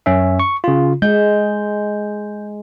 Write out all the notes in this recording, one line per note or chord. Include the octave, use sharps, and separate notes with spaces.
F#2 C#4 E5
C#6
C#3 F4
G#3 G6